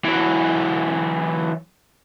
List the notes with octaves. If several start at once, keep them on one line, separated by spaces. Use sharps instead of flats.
E3 F#3